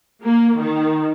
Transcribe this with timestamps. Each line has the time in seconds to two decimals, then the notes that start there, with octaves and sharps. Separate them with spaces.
0.23 A#3
0.60 D#3